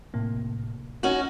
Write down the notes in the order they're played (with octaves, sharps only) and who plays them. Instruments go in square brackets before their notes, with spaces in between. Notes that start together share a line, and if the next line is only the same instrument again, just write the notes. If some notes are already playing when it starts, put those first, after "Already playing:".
[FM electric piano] A2 C3 A#3
[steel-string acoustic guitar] C#4 D#4 F#4 [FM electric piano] C#6